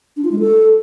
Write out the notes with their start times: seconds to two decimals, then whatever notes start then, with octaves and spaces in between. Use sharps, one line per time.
0.17 D4
0.24 F4
0.32 G#3
0.39 A4